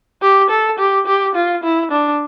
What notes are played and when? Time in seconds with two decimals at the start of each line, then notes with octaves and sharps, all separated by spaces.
0.22 G4
0.50 A4
0.79 G4
1.07 G4
1.35 F4
1.63 E4
1.91 D4